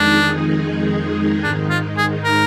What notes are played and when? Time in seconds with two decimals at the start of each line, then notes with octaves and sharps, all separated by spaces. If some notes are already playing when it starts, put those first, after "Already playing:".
Already playing: F2 D#3 G#3 D4 D#4 G#4
1.43 G#2 D#3 G#3 D4 D#4
1.70 F4
1.97 G#4
2.24 A#4